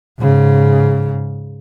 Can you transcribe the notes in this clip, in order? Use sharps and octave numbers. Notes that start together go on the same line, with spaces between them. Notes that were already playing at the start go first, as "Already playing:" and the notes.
G#2 C#3